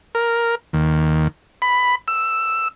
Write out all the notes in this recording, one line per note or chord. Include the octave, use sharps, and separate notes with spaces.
A#4
D#2
B5
E6